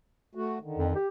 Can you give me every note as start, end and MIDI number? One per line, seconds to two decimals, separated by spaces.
0.35 0.58 57
0.35 0.58 66
0.61 0.97 50
0.61 0.97 51
0.77 0.91 41
0.95 1.08 67